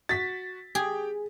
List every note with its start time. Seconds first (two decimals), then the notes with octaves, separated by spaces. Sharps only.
0.09 F#4 A6 B6
0.75 G4 G#4 G5